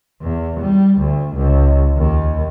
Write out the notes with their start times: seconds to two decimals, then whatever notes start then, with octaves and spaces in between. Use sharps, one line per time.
0.22 E2
0.61 G3
0.99 D2
1.36 C#2
1.97 D#2